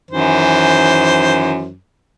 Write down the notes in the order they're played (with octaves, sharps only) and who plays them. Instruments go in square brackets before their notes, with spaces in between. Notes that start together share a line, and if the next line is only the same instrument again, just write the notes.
[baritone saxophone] F#2 [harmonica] D#3 E3 C5